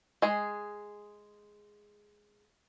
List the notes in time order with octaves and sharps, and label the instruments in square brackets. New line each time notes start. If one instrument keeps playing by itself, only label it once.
[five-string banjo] G#3 G#4